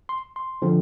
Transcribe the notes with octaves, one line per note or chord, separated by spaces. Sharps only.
C6
C6
D3 F3 C4